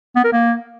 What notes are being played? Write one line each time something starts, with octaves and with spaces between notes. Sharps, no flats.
B3
A#4
A#3